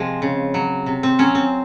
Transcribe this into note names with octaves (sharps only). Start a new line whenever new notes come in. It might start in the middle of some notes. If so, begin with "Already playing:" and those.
Already playing: C3 F3 G#3 C4
C#3
F#3
C3
C4
F#3 C#4
C4